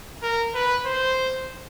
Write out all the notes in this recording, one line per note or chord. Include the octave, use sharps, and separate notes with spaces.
A#4
B4
C5